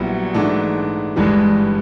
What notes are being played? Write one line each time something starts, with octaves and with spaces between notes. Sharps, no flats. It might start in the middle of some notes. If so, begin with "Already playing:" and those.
Already playing: A#1 A#2 F#3 G3 B3 E4
G#2 E3 A3 D4
G1 G2 E3 G3 G#3